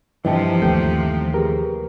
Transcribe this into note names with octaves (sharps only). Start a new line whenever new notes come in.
G2 C3 E3 F3 D#5 G5 A5
D#2 G3 A3 G5 G6
G4 G#4 A#4 B4